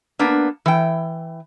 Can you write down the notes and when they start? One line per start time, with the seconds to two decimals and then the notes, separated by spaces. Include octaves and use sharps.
0.19 A#3 B3 D4
0.66 E3 G5